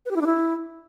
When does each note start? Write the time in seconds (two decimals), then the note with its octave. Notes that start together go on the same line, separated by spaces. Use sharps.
0.06 B4
0.11 G4
0.16 E4
0.21 D4
0.26 E4